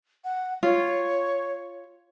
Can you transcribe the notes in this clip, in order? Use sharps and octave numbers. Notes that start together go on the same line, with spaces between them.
F#5
F4 C#5